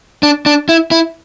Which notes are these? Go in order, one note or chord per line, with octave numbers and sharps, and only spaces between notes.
D4
D4
E4
E4